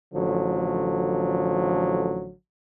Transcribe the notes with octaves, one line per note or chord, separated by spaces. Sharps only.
A1 D3 F3 F#3